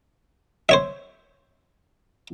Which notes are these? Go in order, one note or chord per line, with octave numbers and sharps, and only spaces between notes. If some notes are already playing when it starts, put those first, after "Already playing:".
C5 C#5 E5